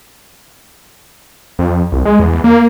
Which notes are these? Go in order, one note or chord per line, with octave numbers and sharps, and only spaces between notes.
F2
C2
G#3
E2
A#3